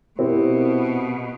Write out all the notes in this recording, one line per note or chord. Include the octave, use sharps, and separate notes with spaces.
B2 C4 E4 G4 A#4